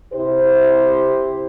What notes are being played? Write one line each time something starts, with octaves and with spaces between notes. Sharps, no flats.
C3 E4 G4 C5